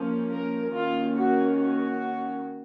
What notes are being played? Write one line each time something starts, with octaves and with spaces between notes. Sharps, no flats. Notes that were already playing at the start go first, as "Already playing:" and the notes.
Already playing: F3 A#3 C#4
A#4
D#3 A#3 C#4 F4
F#4
F#4